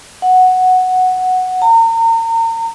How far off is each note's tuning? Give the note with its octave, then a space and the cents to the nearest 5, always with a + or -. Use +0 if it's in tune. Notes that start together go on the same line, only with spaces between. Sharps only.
F#5 +0
A#5 -35